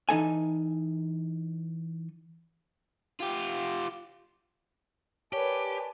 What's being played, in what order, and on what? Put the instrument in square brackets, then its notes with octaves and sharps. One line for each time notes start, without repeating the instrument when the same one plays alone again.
[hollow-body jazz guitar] E3 D#4 A4 G#5
[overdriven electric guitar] F4 G4
[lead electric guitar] G4 [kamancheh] A#4 B4 [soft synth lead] C#5 [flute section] D5 G#5 A5